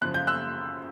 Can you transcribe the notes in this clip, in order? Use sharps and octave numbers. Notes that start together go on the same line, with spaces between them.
F#2 C#3 F3 F#6
G6
E6 F#6